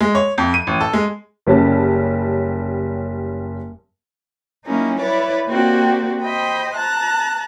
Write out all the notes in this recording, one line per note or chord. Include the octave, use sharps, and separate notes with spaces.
G#3
C#5
F2
D#7
A1
A4
G#3
F#1 G3 C#4 A5
F#3 G3 A#3 C#4 D#4 E4
E4 B4 C#5 D5
A#3 C4 F#4 G4 D5
C5 D#5 G5 B5
A5 A#5 F#6